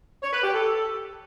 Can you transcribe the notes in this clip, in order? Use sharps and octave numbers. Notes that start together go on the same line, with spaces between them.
C#5
B4
G4
A4